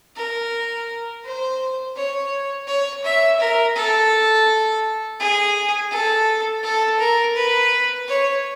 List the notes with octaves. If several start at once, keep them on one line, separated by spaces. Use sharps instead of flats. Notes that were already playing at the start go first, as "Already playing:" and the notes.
A#4
C5
C#5
C#5
E5
A#4
A4
G#4
A4
A4
A#4
B4
C#5